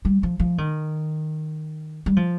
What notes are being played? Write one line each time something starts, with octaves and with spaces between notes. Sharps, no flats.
G3
F3
F3
D#3
G3
F3